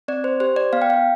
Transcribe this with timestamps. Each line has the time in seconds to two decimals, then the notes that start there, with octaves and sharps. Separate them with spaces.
0.08 C4 D5
0.24 C5
0.40 G4 C5
0.56 D5
0.73 B3 F5
0.82 G5
0.90 F5